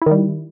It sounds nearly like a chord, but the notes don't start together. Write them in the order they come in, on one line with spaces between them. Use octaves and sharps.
E4 D#3 G3